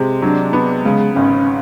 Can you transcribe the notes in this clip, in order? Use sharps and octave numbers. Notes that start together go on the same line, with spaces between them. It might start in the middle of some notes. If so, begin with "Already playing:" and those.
Already playing: C3 G#3
F#3 D4
B3
C#3 G#3
G#1 C#4